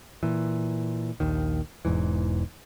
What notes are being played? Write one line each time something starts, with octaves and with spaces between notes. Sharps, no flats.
A#2 E3
A#1 D#2 D#3
E1 E2 G#2 E3